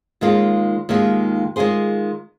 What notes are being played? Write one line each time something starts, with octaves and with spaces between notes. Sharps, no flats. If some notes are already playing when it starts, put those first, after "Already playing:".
D#2 D#3 G#3 F4
D#2 D#3 G#3 F4
D#3 G#3 F4 G#4 C5